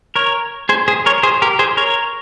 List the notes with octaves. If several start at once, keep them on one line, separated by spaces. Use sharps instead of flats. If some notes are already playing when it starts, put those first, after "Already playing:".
A#4 C#5
G#4 C5
G#4 C5
A#4 C#5
G#4 C5
G4 A#4
G#4 C5
A#4 C#5